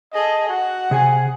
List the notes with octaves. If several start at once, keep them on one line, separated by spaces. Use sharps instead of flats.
G#4 A4 D#5
F#4 F#5
C3 G#4 G#5